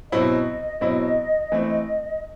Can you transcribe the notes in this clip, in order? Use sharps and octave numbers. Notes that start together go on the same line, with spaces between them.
B2 F#3 C4 E4 D#5
B2 F#3 C4 E4
E3 A3 C4